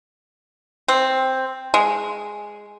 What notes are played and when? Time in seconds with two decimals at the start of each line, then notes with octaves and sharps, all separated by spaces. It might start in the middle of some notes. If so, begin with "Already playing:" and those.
0.88 C4
1.74 G#3